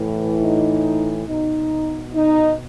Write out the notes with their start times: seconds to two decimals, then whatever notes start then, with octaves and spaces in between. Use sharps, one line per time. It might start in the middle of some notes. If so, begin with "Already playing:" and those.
Already playing: A2 E3
0.41 D#4
1.27 B2 D#4
2.14 D#4